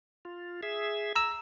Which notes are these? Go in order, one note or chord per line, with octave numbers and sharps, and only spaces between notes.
F4
G#4 E5
A#5 E6